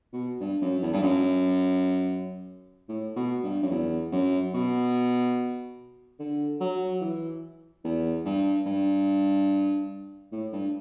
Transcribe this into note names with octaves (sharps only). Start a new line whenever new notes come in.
B2
G2
F#2
E2
G2
F#2
A2
B2
G2
F#2
E2
F#2
B2
D3
F#3
E3
E2
G2
G2
A2
G2